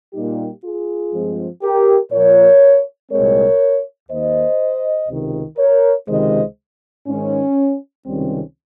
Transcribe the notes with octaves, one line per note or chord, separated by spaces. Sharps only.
A#2 G3 A#3 D#4 G4
F4 G#4
G2 F3 G#3 C4
G4 A#4
A#2 F3 A#3 A#4 C#5
C2 A#2 G#3 C4 A#4 C#5
D#2 D#3 A#3 C5 D#5
C#2 C3 D#3
A#4 C#5
C#2 C3 D#3 G#3 C5 D#5
G#2 D#3 G#3 C#4
C#2 C3 D#3 G3 C4 C#4